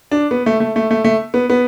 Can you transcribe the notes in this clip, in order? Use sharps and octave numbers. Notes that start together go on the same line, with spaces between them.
D4
B3
A3
A3
A3
A3
A3
B3
B3